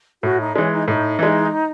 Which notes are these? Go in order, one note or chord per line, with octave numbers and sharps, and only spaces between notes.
A2 F#4
D#4
E3 G#3 C#4
D#4
A2 D#4
E3 G#3